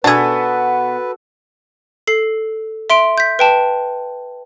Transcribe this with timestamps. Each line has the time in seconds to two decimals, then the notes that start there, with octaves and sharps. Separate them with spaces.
0.04 B2 B3 D4 F#4 G#4 A4 B4
2.08 A4 C7
2.90 E5 C6 D7
3.18 G6 B6
3.39 B4 G5 A5